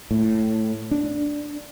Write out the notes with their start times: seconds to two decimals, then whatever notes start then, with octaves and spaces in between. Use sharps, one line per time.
0.11 A2
0.91 D4